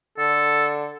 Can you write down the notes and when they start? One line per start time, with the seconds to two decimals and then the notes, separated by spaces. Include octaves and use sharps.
0.18 D3 A4